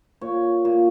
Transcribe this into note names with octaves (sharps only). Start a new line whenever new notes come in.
A#2 C#5
A#2